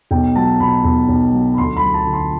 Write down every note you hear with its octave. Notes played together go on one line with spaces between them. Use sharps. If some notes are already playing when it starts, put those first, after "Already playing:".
B1 G5
F#3 A5
B2 B5
B1
B1
F#3
B5
D2 C6
B5
F#3
A5
D3
C6